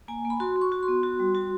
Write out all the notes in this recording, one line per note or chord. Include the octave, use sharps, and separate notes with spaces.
A#3 G#5
A#3
B5
F#4 C6
F#4
C#6
F#4
C6
B3
F#4
G3
F#4